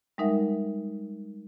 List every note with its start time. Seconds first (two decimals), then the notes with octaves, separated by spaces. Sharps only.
0.18 G3 G#3 D#4 A#4 E5 F#5